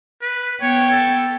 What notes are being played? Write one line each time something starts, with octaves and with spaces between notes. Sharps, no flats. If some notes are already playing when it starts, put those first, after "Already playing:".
B4
B3 C#5 G5
A4